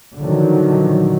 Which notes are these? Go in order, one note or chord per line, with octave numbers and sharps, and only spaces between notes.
A#2 D3 D#3 F3 F#3